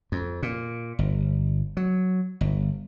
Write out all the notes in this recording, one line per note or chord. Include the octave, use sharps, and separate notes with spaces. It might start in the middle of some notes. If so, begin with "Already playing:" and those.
F2
A#2
G1
F#3
G1